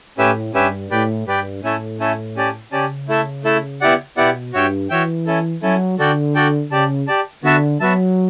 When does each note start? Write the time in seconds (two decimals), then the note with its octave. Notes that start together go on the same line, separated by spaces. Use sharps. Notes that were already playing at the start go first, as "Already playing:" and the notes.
0.18 A2 C#4 G4 B4 E5
0.54 G2 C#4 G4 B4 E5
0.91 A2 G4 B4 D5 G5
1.26 G2 G4 B4 D5 G5
1.63 A2 A3 C#4 E4 A4 E5
2.00 A3 C#4 E4 A4 E5
2.36 C#4 G4 D5 A5
2.72 C#3 C#4 G4 D5 A5
3.08 A3 E4 A4 E5
3.44 A3 E4 A4 E5
3.81 B3 E4 G4 D5 F#5
4.17 B2 B3 E4 G4 D5 F#5
4.53 G2 F#4 C#5 E5 G5
4.90 E3 F#4 C#5 E5 G5
5.26 C#4 E4 A4
5.62 F#3 C#4 E4 A4
5.98 D3 F#4 A4 D5 G5
6.35 F#4 A4 D5 G5
6.71 C#3 G4 D5 A5
7.07 G4 D5 A5
7.43 D3 B3 F#4 B4 E5 A5
7.80 F#3 B3 F#4 B4 E5 A5